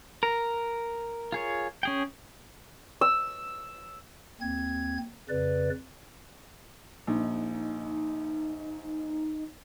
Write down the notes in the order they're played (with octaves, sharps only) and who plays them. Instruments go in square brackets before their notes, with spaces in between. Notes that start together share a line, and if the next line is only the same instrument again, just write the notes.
[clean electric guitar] A#4
[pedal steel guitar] F4 G#4 C#5
C#4 G#4 G5
[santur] E6
[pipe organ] D#2 C4 G#6
F2 C#3 B4 D5
[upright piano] A#1 [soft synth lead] D#4